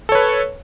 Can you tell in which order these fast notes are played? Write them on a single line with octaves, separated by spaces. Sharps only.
A4 C#5 B4